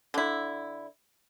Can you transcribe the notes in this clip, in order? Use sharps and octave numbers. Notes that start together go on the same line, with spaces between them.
D3 E4